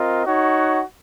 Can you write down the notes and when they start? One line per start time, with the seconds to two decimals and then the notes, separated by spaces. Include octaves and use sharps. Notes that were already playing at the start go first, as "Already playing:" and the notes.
Already playing: C4 F4 A#4 D#5
0.25 D#4 F#4 C#5 F#5